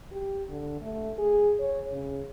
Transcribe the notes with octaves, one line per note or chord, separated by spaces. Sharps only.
G4
D3
A3
G#4
C#5
C#3